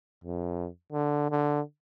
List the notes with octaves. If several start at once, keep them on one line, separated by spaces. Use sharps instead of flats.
F2
D3
D3